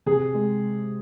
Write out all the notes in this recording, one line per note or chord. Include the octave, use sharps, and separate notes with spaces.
C3 G#4
G#3